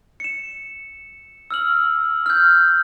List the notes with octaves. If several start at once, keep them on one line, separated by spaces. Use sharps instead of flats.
C#7 E7
E6 F6 F#7
F6 G6